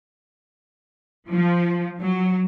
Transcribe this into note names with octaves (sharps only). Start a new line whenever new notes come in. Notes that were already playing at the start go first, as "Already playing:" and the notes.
F3
F#3